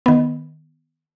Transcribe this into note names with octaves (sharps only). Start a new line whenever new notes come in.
D#3 B3